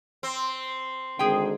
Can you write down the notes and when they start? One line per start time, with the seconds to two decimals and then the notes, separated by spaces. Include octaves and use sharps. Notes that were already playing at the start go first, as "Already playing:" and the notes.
0.23 C4
1.19 G#1 G#2 D3 G#4 G5